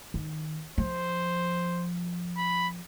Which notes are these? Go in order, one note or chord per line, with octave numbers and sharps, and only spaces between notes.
D#3
F3 C5
B5